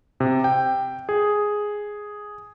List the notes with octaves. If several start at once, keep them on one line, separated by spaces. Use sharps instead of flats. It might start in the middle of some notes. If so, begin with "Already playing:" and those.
C3
G5
G#4